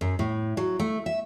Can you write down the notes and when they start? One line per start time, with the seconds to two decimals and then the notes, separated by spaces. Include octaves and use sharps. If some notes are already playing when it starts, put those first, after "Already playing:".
0.01 F#2
0.19 A2
0.57 F#3
0.80 A3
1.06 E5